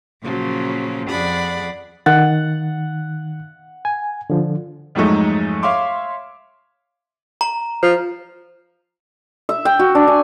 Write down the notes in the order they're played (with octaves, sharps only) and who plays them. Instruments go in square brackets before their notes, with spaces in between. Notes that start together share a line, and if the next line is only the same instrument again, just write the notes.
[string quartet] A#2 C#3 F3 F#3
F2 G#4 D5 F#5 B5
[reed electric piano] D#3 A6 [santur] F#5
[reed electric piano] G#5
D3 F3
[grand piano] F2 G#2 F#3 G#3 A3 D#4
C#5 E5 F5 C6 D6
[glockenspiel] A#5
[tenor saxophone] F3
[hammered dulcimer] E5
G5
F#4
D4
G#5